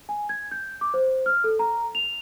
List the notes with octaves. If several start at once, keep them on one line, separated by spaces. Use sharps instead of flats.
G#5
G#6
G6
D6
C5
F6
A4
A#5
F7